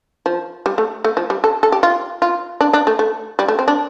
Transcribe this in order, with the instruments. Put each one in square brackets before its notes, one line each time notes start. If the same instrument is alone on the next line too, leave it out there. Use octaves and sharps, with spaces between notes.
[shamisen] F3
G3
A3
A3
F3
G3
A4
A4
G4
F4
F4
D4
D4
A3
A3
G3
A3
C4
D4